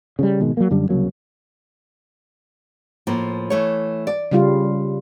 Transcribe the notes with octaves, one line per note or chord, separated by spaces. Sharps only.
C#3 F3 G3
G#1 B2 D#3 G#3
F#3 G3 A#3
F#2 D3 G3
C2 C#3 F#3 A#3
A2 F3 A#3
E3 A3 C#5
D5
C#3 G3 F4